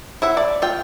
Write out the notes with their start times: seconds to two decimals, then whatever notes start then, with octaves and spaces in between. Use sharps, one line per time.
0.22 E4 E5 F#5
0.37 D5
0.62 F4 G5